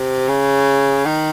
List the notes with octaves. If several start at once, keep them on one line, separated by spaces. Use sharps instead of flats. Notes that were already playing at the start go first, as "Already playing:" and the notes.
Already playing: C3
C#3
D#3